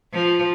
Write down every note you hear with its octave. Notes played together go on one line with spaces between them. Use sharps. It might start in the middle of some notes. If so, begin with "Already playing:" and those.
F3